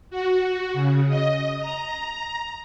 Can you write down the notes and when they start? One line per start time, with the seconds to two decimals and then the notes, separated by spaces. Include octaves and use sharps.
0.10 F#4
0.73 C#3
1.08 D#5
1.60 A#5